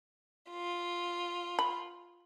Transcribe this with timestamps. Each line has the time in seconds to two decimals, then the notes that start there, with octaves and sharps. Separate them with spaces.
0.50 F4
1.59 B5